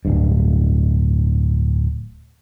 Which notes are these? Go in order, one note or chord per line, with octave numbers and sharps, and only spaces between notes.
D1 G2